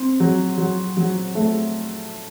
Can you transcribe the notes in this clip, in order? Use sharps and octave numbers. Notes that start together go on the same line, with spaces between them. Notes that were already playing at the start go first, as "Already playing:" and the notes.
Already playing: C4
F#3
F#3
F#3
A3